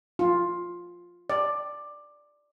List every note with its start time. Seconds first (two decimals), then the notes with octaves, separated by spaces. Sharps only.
0.19 F4
1.30 D5